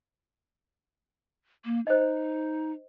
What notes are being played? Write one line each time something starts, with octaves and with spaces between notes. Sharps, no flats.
A#3
D#4 C5 D#5